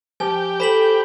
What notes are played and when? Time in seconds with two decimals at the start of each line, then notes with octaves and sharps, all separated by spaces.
0.20 F3 G4 G#5
0.60 A4 C5 B5 B6 F#7